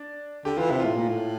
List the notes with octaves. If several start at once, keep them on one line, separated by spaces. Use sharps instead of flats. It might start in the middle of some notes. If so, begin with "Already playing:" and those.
Already playing: D4
D3 G4
E3 F4
C3 E4
A2 F4
A#2
A2